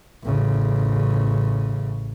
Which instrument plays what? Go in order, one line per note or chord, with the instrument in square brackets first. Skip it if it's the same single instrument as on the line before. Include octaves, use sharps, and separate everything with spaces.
[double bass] A1 C#3